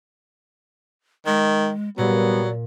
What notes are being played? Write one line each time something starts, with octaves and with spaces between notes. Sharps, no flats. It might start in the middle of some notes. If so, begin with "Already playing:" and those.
D#3 G#3
A#2 F#3 G3 B3 D5